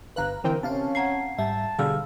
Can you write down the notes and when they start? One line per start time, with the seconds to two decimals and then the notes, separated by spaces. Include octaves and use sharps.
0.16 G1 B4 F5 A#5 F#6
0.44 D3 E3 C4 A#4 G5
0.63 C3 C4 C#4 F5 A5
0.95 F#5 A#5 G#6 C7
1.38 G#2 G3 E5 A5
1.79 B2 D3 G3 G#4 F5 E6 F6